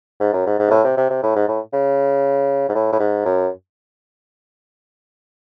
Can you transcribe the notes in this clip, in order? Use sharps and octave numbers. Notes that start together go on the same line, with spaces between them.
G#2
F#2
G#2
G#2
C3
A2
C3
C3
C3
A2
G#2
A2
C#3
G#2
A2
A2
G#2
F#2